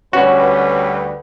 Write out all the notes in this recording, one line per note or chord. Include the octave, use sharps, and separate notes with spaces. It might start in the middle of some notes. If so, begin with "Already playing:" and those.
D2 G3 C#4 F#4 B4